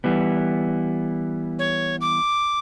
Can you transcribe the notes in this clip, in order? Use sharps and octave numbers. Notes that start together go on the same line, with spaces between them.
E3 G3 B3
C#5
D6